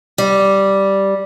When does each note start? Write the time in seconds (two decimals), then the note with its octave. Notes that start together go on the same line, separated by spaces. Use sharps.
0.18 G3